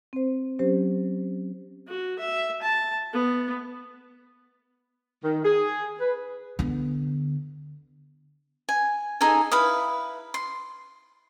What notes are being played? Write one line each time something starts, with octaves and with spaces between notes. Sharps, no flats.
C4 C5
F#3 C#4 G4 C5
F#4
E5
A5
B3
D#3
G#4
B4
D3 B3
G#5
D#4 G#4 A4 G#5
E4 B4 F5 D#6
C6